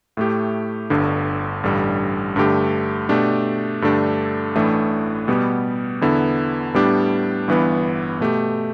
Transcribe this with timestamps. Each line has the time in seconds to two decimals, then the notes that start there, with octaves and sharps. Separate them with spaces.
0.17 A2 A3 G4
0.90 G1 G2 D3
1.63 A1 G2 D3 G3
2.36 G2 D3 A3 G4
3.09 B2 A3 D4 G4
3.82 G2 D3 A3 D4 G4
4.55 A1 A2 E3 A3 D4
5.28 B2 G3 B3 G4
6.01 E2 D3 B3 E4
6.74 A2 G3 B3 D4 G4
7.47 G1 G2 E3 B3
8.20 B2 A3 G4